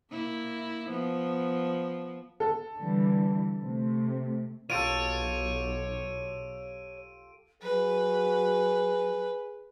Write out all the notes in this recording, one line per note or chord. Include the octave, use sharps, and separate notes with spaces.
A#3 E4
F3 B3
A4
D3 E3 G3
C3 A3
B1 F4 G4 A4 C#5 D7 D#7
F#3 G#4 B4